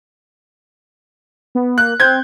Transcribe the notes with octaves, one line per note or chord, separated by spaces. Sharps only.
B3
A#3 F#6
C4 G6 G#6